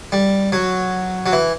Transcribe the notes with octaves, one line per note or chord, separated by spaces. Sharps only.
G3
F#3
F#3
E3